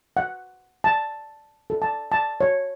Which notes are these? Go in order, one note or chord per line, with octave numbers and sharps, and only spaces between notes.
F#5
A5
A4
A5
A5
C#5